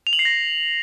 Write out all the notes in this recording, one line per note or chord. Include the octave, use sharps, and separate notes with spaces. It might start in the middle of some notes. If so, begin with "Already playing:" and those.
F7
F#7
C7
A#6